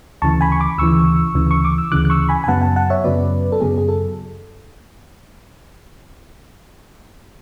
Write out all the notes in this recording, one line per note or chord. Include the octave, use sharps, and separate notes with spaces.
D2 C#3 E3 A5 C#6
G#5 B5
C#6
B5 D6
D2 C#3 E3 C#6 E6
D2 C#3 E3
C#6
D6
E6
D2 C#3 E3 D6 F#6
F#6
C#6 E6
G#5 B5
G#5
F#2 C#3 F#3 B3 F#5 A5
F#5 A5
F#5 A5
C#5 E5
F#2 C#3 F#3 B3 B4 D5
A4
F#2 C#3 F#3 B3 G#4
G#4
A4